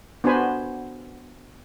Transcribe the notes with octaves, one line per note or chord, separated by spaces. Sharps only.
B3 D4 F#4 C5 G#5 B5